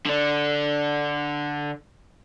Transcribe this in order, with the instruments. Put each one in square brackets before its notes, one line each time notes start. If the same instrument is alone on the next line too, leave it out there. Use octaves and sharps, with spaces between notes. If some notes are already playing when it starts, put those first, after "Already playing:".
[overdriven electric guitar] D3 D4